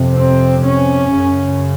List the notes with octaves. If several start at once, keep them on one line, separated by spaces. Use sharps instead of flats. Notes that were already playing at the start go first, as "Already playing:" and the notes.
Already playing: F2 C3
C4
C#4
F#2 C#3